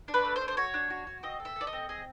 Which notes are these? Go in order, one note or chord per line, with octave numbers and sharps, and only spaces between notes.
D4
B4
A3
C5
D4
C5
F#4 C#5
D4
F#4
F#4
C4 D#5
A4
E5
A4 D5
D#5
C4
G#4 D#5